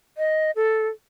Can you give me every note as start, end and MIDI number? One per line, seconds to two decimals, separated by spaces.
0.18 0.51 75
0.56 0.88 69